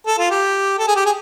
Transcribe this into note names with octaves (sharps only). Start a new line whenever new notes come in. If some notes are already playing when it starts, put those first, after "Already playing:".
A4
F4
G4
A4
G#4
G4
G#4